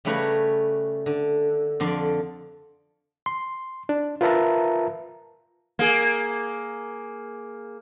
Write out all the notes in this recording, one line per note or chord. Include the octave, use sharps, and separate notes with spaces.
C#3 G3 A3 B4 C#5 A#5
D3
F2 D3 D5 C6
C6
D4
F4 A#4 B4 E5 A5 A#5
A#3 G#4